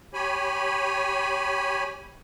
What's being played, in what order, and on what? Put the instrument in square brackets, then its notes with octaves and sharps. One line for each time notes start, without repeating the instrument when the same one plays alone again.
[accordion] G4 C#5 G#5 B5